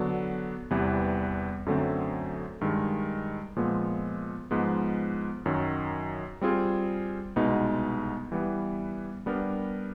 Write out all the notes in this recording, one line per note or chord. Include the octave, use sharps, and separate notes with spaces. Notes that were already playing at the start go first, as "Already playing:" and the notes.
Already playing: D3 F#3 B3 D4 F#4
E2 C3 E3 G3 B3
F#2 D3 F#3 A3 C4
G2 D#3 G#3
A#2 F3 G#3 B3
G#2 F3 G#3 B3
F#2 D#3 F#3
G3 C4 F4 G#4
C2 B2 G#3 B3 D#4
E3 G3 B3
G3 B3 D4 G4 A#4